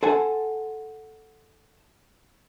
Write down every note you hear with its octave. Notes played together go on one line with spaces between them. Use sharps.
A4 C5 F#5 G#5